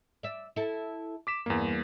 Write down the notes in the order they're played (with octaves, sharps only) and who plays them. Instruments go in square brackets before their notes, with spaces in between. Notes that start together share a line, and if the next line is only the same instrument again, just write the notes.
[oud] D5 E5
E4 A4
[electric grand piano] D6 B6 E7
[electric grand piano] E2 A#3 [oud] G2